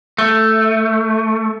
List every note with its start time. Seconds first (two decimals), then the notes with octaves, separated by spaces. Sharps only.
0.18 A3